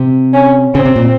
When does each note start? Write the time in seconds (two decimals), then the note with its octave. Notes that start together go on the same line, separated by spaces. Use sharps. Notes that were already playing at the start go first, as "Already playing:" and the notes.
Already playing: C3
0.34 C#4
0.74 C#3 C4
0.85 C3
0.96 A#2